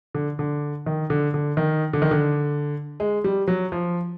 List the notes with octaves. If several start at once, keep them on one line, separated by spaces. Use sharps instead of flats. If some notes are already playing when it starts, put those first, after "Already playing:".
D3
D3
D#3
D3
D3
D#3
D3
D#3
D3
G#3
G3
F#3
F3